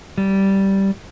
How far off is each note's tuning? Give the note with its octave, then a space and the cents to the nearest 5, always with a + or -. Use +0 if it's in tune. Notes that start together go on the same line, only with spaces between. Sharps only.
G3 -10